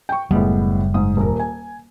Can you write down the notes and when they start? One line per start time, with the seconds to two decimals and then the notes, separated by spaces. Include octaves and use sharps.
0.09 G5 C#6
0.31 F#1 A2 G3 G#3 B3
0.94 G#2 D#6
1.17 D#1 A#4
1.39 G#5